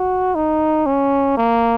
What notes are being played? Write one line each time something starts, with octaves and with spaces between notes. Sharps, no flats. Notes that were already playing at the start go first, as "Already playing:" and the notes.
Already playing: F#4
D#4
C#4
A#3